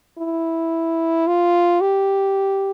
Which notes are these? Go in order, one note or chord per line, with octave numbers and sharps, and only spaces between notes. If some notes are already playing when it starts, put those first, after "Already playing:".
E4
F4
G4